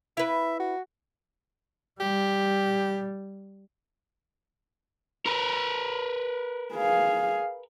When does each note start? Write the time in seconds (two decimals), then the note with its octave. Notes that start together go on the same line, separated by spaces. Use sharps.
0.17 E4 B4 E5
0.60 F#4
2.00 G3 G4
5.26 A#4 B4
6.74 G#4 F5